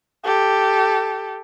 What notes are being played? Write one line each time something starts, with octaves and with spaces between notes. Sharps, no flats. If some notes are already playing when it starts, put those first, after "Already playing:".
G4 A4